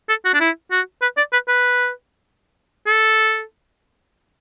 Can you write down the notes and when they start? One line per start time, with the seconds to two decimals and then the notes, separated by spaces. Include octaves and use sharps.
0.09 A4
0.25 F#4
0.34 D4
0.40 E4
0.71 F#4
1.02 B4
1.17 D5
1.32 B4
1.48 B4
2.86 A4